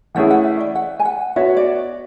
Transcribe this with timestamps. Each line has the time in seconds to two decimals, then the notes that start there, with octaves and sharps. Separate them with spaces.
0.15 E3 A3 C#4 E4 G#4 F#5
0.30 F#5
0.45 E5
0.60 D5
0.75 F#5
1.00 G#5
1.05 F#5
1.36 B3 F#4 C#5 E5
1.57 D5